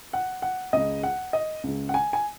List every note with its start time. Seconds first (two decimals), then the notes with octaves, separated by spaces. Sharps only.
0.13 F#5
0.42 F#5
0.73 C#2 C#3 D#5
1.03 F#5
1.33 D#5
1.64 C#2 C#3
1.89 F#5
1.94 G#5
2.13 G#5